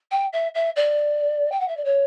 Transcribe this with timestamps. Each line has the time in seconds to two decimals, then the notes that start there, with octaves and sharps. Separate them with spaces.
0.11 G5
0.33 E5
0.54 E5
0.76 D5
1.52 G5
1.60 F#5
1.68 E5
1.77 D5
1.84 C#5